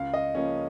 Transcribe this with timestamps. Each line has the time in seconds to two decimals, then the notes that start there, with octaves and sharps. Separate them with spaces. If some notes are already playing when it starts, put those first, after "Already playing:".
Already playing: C#2 F5
0.14 D#5
0.35 C#3 F3 A#3 C#4